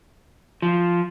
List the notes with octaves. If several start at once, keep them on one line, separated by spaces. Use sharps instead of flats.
F3